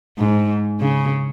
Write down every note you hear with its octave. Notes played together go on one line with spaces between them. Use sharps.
G#2
C#3